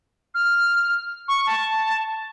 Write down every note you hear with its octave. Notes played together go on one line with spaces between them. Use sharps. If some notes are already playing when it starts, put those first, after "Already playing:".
F6
C#6
A5